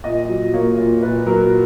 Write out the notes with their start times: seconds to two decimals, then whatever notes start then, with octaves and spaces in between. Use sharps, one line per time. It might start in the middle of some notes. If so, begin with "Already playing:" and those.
0.04 A#2 D#5
0.29 F#3
0.53 A#3 C#5
0.78 A#2
1.02 A#2 B4
1.26 F#3 A#4